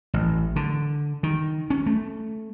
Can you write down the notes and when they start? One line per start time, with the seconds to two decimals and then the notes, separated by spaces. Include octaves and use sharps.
0.14 A1
0.56 D3
1.23 D#3
1.70 C#4
1.86 A3